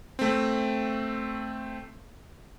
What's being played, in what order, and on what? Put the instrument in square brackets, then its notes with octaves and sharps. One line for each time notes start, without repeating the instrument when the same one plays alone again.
[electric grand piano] A3 C4